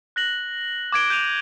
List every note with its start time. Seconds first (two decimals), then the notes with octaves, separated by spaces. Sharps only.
0.16 F#6 A#6 F#7
0.92 D6 G#6 D7 G7
1.10 G6 D#7 F7